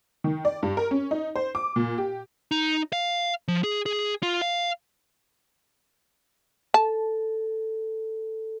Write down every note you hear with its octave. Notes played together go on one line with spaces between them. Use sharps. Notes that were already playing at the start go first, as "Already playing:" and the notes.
D#3
D5
G2
A#4
C#4
D#4
C5
D6
A#2
G4
D#4
F5
F3
G#4
G#4
F4
F5
A4 A5